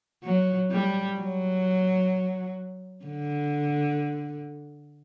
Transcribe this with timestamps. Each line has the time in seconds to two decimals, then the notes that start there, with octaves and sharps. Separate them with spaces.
0.23 F#3
0.71 G3
1.17 F#3
3.05 D3